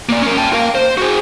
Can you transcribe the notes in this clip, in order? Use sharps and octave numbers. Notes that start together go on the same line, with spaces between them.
A#3 D5
C#4 A#4
G5 A5
A#4 F5
C5
F#4 G#4